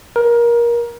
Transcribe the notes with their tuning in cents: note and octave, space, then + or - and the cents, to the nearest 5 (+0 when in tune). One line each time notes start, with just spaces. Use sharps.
A#4 +20